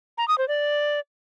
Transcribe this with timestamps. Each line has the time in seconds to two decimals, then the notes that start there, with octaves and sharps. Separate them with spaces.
0.18 A#5
0.28 D#6
0.38 C5
0.48 D5